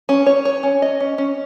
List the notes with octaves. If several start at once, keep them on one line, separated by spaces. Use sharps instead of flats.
C#4
C#5
C#5
C#4
D#5
C#4
C#4